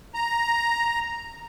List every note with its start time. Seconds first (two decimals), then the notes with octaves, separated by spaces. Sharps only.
0.14 A#5